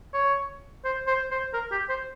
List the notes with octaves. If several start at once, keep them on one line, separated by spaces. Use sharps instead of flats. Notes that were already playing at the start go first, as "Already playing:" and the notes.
C#5
C5
C5
C5
A#4
G4
C5